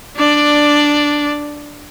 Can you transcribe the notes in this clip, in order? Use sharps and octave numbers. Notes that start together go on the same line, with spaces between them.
D4 D5